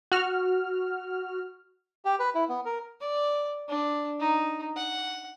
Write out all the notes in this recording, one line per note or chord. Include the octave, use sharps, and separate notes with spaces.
F#4 F6
G4
B4
E4
B3
A#4
D5
D4
D#4
F#5